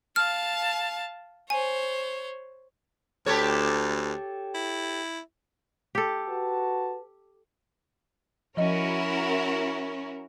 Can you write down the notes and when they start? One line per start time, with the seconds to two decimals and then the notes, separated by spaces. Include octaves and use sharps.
0.16 F5 A5 F6
1.50 C5 C#5 G#5
3.26 D2 G4 A4 C#5
4.54 E4
5.95 G4 A4
6.27 F#4 B4 A5
8.57 F3 C#4 E4 F#4 A#4 D#5